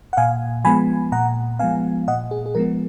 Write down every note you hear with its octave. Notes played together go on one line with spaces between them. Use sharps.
F#5
A#2 F5 G#5
F3 G#3 B3 G#5 B5
A#2 F#5 A#5
F3 G#3 B3 F5 G#5
A#2 D#5 F#5
G#4
G#4
F3 G#3 B3 A#4